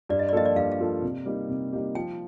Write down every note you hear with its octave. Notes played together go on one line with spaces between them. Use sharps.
G2 D5
D#5
D5
F3 A#3 F4 A4 D#5
D5
G2 F5
F5
F3 A#3 F4 A4
C3
G3 A#3 D#4 G4
C3
G3 A#3 D#4 G4
F3 G5